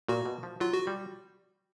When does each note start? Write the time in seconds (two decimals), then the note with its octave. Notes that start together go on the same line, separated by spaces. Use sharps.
0.08 A#2 F#4
0.26 B2
0.43 F3
0.60 F#3 F4
0.73 F#4
0.87 G3